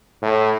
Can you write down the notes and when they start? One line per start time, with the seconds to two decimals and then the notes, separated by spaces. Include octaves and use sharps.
0.22 A2